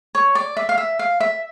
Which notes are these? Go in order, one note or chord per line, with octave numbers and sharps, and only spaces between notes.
C#5
D5
E5
F5
E5
F5
E5